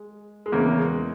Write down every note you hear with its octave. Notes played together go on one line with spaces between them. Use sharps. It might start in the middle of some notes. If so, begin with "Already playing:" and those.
Already playing: G#3
G#3
E2 C#3 E3 A#3
G#3